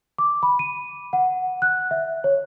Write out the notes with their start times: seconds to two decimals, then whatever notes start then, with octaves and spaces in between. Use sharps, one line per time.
0.18 D6
0.43 B5
0.59 D#7
1.13 F#5
1.62 F#6
1.91 E5
2.24 C#5